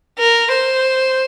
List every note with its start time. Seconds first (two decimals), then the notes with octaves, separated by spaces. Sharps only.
0.19 A#4
0.52 C5